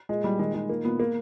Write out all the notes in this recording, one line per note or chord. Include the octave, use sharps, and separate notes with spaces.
A#2 G#3
A#2 G3
D#3 G#3
D#3 G#3
A#2 A#3
A#2 B3
A#3